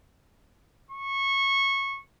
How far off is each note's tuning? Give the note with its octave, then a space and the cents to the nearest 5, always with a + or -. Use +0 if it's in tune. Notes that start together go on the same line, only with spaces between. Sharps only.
C#6 -15